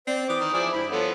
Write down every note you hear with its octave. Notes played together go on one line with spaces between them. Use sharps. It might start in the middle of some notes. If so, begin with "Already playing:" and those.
C4 C5 D5
E3 D6 D#6
D#3
F3 E4 G#4 D5
G2 E4 B5
F3 B3 A4 C#5